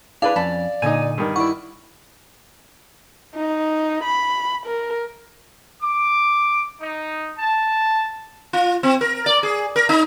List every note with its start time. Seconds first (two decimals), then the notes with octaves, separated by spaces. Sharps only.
0.22 D4 E4 G#4 B4 D5 F5
0.36 F2 C#4 D5 A5 B5
0.82 A#2 D3 D#4 G#5 D#7
1.18 G2 D#3
1.36 E4 D5 F#5 C#6
3.34 D#4
4.04 B5
4.66 A#4
5.82 D6
6.80 D#4
7.38 A5
8.53 F4
8.83 C4
9.01 A#4
9.26 D5
9.43 G#4
9.76 A#4
9.89 D#4